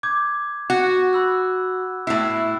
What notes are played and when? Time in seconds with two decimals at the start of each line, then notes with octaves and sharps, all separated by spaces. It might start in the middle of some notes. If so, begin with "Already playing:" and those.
0.03 D6 G6 G#6
0.70 F#4 F#6
1.13 B5 E6 F#6
2.07 A2 E4 E6 F#6 C7